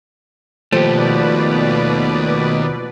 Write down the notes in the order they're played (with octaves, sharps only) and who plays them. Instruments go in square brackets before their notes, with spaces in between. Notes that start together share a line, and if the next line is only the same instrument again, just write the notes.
[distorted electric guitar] D#2 [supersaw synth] B2 B4 D5 [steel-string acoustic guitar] F3 [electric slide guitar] A3 G4